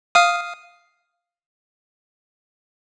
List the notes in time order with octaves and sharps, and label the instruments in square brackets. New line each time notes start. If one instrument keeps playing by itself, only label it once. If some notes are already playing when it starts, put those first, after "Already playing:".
[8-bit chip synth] F5 D#6